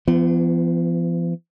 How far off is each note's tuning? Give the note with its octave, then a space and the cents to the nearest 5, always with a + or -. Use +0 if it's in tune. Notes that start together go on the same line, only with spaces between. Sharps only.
F3 -45 B3 +20